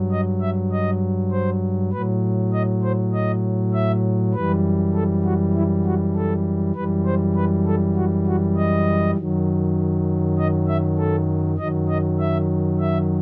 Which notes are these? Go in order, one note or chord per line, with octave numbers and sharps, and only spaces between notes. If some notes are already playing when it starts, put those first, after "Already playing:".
Already playing: G2 F#3
D#5
E5
D#5
C5
A2 F#3 B4
D#5
C5
D#5
E5
F#2 E3 G3 B4
A4
F#4
E4
F#4
A4
F#2 E3 G3 B4
C5
B4
A4
F#4
F#4
D#5
F#2 D#3 F#3
D#5
E5
A4
F#2 D#3 F#3 D#5
D#5
E5
E5